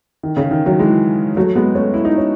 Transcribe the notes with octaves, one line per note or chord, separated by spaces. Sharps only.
D#3
C#3
D#3
D#3 F#3
E3 G#3
F#3 A3
G#3 B3
A3 C#4
E4
D#4
C#4